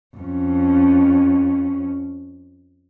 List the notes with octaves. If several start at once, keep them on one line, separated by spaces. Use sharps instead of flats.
F2 C#4